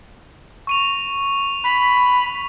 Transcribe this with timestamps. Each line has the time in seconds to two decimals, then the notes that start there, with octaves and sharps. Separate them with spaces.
0.67 C#6 D#7 F7
1.64 B5